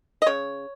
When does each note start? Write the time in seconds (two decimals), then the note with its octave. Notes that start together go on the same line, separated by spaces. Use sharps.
0.22 D#5
0.26 C#3 C#5